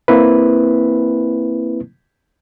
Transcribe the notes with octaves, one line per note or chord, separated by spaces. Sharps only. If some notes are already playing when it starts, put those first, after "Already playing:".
A#3 C4 E4 B4